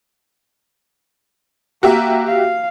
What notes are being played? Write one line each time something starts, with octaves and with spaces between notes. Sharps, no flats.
A#3 F#4 G4 E5
F5